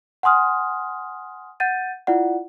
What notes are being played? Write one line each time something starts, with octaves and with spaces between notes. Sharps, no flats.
F#5 G#5 C6 D#6 F6
F#5 G6 A6 D#7
E4 F4 D5 F#5